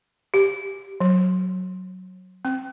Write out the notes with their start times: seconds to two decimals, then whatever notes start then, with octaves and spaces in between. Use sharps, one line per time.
0.34 G4
1.00 F#3
2.45 C4